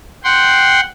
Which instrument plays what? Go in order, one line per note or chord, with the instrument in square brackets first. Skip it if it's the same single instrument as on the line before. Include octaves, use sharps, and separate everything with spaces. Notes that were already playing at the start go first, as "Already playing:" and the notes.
[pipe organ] F#5 G5 C6